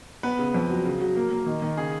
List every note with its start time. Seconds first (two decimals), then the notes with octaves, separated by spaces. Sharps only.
0.23 B3 B4
0.39 C#3
0.54 F2
0.70 F#3
0.85 C#3
1.01 F#3
1.16 A#3
1.31 A#3
1.46 D#3
1.62 D#3
1.77 C#3 G#4